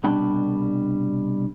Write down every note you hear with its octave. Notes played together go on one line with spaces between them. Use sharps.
C2 B2 G3 D4 G5 B5